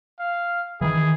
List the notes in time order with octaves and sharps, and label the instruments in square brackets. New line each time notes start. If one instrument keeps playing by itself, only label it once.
[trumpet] F5
[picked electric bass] D#3 E3 [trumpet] G#4